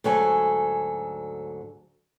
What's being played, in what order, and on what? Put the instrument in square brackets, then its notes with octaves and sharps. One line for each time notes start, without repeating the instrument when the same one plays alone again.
[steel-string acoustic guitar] D2 G#2 F#3 A4 G#5